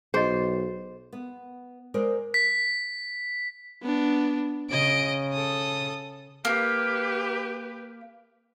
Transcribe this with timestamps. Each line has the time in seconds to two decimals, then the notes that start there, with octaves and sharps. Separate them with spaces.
0.14 B1 G#4 C5 D#5
1.13 B3
1.94 G#3 A#4 C5 D5
2.34 B6
3.83 B3 D4
4.71 C#3 D#5 D7
5.33 A4 D#6
6.45 A#3 G4 B4